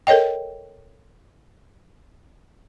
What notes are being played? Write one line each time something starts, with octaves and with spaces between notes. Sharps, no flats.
A4 A#4 C#5 D#5 G5